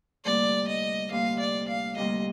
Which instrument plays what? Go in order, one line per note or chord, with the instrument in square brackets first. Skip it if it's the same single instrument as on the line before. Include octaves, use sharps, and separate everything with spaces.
[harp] D2 C3 G3 A#3 [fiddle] D5
[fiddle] D#5
[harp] D2 C3 G3 A#3 [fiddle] F5
[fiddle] D5
F5
[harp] D2 C3 G3 A#3 [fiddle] D#5